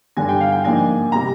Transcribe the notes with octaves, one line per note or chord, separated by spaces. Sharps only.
G2 D3 G3 D4 G#5
G5
F5
G5
G#2 F3 A#3 D4 G#5
C3 G3 A#5